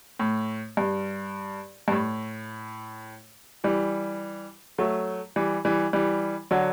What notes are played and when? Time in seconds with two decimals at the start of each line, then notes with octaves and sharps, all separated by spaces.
0.20 A2
0.77 G2
1.88 G2
1.92 A2
3.64 E3 G3
4.79 F#3 A3
5.36 E3 G3
5.65 E3 G3
5.93 E3 G3
6.51 D3 F#3